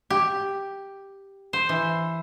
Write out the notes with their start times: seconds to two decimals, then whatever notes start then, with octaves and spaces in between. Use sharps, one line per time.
0.10 G4
1.53 C5
1.69 E3